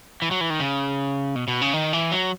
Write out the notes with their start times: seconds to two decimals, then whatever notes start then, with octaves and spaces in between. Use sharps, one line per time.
0.22 E3
0.31 F#3
0.41 E3
0.50 D#3
0.60 C#3
1.36 B2
1.48 B2
1.62 C#3
1.74 D#3
1.93 E3
2.11 F#3